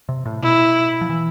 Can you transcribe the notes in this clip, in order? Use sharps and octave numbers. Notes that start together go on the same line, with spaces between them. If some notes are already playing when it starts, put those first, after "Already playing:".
C3
A2
B2 E4
F3
E3